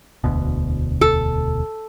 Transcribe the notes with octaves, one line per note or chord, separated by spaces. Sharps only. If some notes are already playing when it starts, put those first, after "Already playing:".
E1 D2 B2
A4